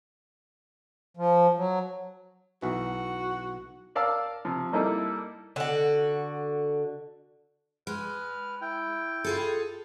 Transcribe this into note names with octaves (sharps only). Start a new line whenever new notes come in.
F3
F#3
B1 E3 F#4
A#4 D5 F5 A5 E6
C3 F3
G3 A#3 D#4 E4 A4
D3 F#4
G#3 B4 F6
E4 G5
F4 G#4 A4